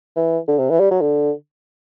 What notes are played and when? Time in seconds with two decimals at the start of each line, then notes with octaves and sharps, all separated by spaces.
0.16 E3
0.48 D3
0.59 C3
0.70 E3
0.80 G3
0.91 F#3
1.01 D3